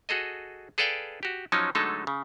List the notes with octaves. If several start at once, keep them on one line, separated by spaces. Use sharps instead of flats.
F#4 G#4 A4 D#5
G#4 A4 B4 D5 F5 G5
F#4 G4
F3 F#3 C#4 D#4
D3 F#3 G#3 A3 D#4 A4
C#3